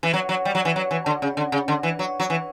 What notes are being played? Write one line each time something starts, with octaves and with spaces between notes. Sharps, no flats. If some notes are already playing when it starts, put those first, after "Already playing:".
E3
F#3
F#3
G3
F#3
E3
F#3
E3
D3
C#3
D3
C#3
D3
E3
F#3
F#3
E3